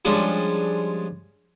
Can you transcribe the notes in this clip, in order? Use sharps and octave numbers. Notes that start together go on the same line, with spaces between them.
F3 G3 G#3 C#4 D4